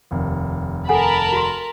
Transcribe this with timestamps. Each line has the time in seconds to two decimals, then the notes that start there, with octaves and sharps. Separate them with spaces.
0.11 F1 D#2
0.89 A4 A#4 F#5 G#5 A5 B5
1.33 F#4 C6